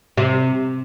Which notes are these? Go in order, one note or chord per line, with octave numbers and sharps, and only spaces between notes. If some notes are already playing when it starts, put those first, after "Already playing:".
C3